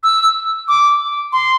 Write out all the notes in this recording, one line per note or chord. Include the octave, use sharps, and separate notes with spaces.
E6
D6
C6